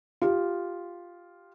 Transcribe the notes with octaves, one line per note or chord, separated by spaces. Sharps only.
F4 G4